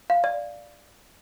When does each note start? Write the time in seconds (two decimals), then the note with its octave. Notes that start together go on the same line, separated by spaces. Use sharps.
0.10 F5
0.24 D5